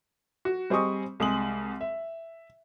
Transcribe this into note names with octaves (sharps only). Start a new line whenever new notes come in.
F#4
G3 C4 G#4 D#5 C#6 D#6
C2 G#3 D#6 F#7
E5